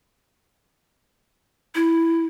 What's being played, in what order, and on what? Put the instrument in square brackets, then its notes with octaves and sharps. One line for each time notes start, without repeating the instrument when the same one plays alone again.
[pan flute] E4